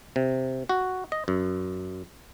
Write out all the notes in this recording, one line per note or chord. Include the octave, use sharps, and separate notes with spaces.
C3
F#4
D#5
F#2